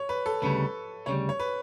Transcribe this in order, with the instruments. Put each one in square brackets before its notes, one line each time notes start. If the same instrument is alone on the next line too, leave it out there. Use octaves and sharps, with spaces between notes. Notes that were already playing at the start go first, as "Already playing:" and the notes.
Already playing: [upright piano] C#5
B4
A4
[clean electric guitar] D2 C#3 G3 [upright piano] B4
[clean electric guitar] D2 C#3 G3 [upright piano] C#5
[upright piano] C#5
B4